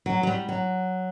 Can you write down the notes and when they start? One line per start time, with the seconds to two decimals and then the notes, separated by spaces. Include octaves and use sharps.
0.06 F#3
0.23 F#3
0.27 G3
0.49 F#3